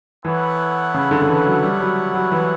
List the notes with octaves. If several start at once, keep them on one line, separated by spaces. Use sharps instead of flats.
E3 B3 E4 A4 C#5 F#5
C#3
D3
D3
E3
F#3
G3
F#3
F#3
E3